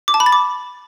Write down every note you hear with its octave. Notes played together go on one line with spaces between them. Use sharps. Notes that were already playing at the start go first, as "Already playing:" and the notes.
D6
A5
B5
A6
D6